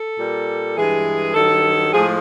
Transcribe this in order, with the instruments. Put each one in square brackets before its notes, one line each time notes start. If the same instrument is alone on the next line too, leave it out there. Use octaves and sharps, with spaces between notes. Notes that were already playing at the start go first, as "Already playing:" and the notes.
Already playing: [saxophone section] A4
A#2 G3
G2 E3 G#3 G#4
G2 D#3 F#3 A4
A2 F3 G#3 G#4